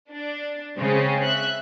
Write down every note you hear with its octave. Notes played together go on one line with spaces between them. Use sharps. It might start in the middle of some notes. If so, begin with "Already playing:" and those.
D4
C#3 G#3 C4 C#4
E5 F#6